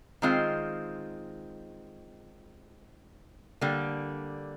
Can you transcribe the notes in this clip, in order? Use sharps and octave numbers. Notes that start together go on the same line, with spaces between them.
D#3 G#3 C4 F4
D3 G3 A#3